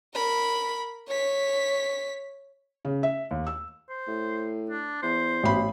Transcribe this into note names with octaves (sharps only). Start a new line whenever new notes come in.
A#4 B5
C#5 B6
C#3
E5
D#2
E6
C5
A2
D4
E2 C5
A1 B2 B5